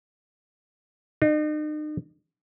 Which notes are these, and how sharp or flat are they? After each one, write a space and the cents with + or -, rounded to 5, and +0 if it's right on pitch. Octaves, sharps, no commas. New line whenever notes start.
D#4 -40